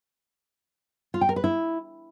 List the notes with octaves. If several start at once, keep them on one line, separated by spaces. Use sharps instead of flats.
F4
G5
A#4
B4
E4